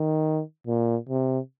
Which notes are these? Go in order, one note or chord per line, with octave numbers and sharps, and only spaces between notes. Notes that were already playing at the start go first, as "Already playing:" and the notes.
Already playing: D#3
A#2
C3